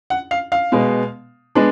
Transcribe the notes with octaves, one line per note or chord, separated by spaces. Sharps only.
F#5
F5
F5
B2 G#3 B3
G#3 B3 D4